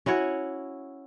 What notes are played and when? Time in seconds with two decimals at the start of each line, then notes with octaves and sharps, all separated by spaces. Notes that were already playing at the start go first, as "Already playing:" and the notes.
0.06 C#4 E4 F#4 C#5